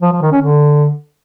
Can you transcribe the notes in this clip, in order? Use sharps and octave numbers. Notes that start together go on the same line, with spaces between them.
F3
F3
D#3
C#4
D3